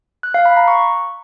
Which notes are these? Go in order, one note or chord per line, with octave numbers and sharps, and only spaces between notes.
F#6
F5
B5
A#5
C#6